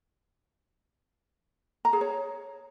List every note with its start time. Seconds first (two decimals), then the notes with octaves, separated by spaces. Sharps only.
1.85 A#5
1.93 G#4
2.01 C#5